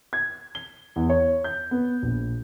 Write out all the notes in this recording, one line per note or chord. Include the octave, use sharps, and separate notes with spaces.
G#6
G7
E2
C#5
G6
B3
A#1